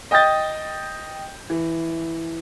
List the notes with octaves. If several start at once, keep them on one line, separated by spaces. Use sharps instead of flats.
D#5 G5 D#6 G6 A6
E3